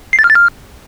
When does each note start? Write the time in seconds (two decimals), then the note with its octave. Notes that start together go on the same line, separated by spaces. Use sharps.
0.13 C7
0.19 A6
0.24 F6
0.30 A6
0.35 F6